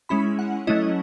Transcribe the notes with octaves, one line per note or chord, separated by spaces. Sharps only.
G#3 C#4 E4 B5
F#5
F#3 A3 C#4 E4 D#5